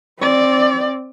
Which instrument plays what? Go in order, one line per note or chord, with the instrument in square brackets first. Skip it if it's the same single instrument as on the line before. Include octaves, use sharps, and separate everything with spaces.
[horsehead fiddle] C4 D5